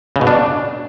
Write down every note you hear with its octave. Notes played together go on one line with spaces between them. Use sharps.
C#3
B2
D4